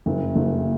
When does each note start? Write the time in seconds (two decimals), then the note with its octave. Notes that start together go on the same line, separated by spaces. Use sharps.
0.06 F#1
0.36 F#1